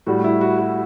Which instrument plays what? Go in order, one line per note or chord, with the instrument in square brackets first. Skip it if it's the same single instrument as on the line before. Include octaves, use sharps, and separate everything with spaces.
[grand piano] A2 G3 F#4
E4
F#4
F#4